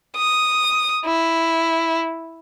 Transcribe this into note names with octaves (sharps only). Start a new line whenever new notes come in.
D#6
E4